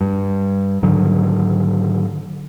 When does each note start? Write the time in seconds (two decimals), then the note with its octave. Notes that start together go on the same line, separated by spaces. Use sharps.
0.01 G2
0.83 G#2 D3 D#3 F#3